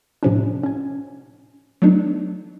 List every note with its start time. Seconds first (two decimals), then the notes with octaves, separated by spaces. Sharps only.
0.23 A2 C3 F3 C#4 D4
0.63 C#4 G#5
1.82 F#3 A3 B3 D4 D#4